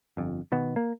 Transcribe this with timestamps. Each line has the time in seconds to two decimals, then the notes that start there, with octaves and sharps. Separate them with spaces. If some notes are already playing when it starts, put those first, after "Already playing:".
0.17 G1 F2
0.52 B2 D#3 B3
0.76 A#3